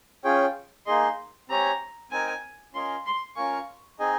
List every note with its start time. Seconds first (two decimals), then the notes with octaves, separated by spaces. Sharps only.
0.24 C#4 F4 G#4 C#5 G5
0.86 A#3 D#4 G#4 D#5 C6
1.49 C4 G4 C#5 G#5 A#5
2.11 C4 D#4 A#4 G#5
2.73 C#4 F4 A#4 D#5 G#5 C6
3.06 C6
3.36 C#4 F4 A#4 F5 G#5 C#6
3.99 C4 D#4 G#4 D#5 G#5